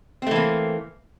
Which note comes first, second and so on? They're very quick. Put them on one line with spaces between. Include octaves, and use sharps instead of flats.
C4 A3 E3 A#3